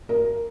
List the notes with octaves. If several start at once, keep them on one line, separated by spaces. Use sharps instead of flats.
A#4